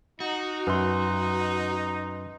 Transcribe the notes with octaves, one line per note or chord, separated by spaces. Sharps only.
D#4 F#4
F#2 B4 C6